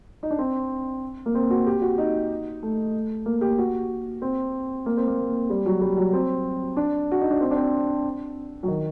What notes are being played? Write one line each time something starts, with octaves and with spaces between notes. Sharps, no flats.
D#4
D4
C4
A#3
C4
F#4
G4
F#4
D#4
A3
A#3
G4
F#4
C4
A#3
C4
A#3
G3
F#3
G3
F#3
C4
D4
F#4
D#4
D4
C4
D4
C4
F#3
D#3